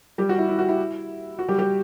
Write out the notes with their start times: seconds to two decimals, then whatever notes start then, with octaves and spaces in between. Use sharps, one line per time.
0.18 G3 G4
0.29 F#4
0.38 E4
0.49 E4
0.59 F#4
0.69 E4
1.39 F#4
1.49 G3 G4
1.59 G3 G4